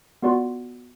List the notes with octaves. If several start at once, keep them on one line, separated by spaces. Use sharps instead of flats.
B3 F4 F#4 D5 F#5 C6